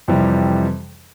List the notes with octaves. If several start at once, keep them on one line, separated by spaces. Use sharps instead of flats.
F2 C3 E3 G3